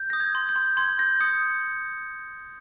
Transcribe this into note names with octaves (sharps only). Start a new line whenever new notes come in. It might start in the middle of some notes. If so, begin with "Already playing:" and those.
Already playing: G6
D#6 A#6
G#6
C6
G6
C6
C6 G#6
G6 A#6
D#6 C#7